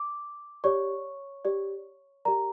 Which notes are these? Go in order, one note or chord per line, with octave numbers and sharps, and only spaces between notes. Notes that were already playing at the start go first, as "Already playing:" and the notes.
Already playing: D6
G4 C#5 D5 C#6
G4 D5
G4 A#4 D5 A#5